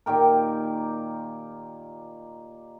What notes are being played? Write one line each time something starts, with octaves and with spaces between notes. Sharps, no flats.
A#2 D#3 G4 A#4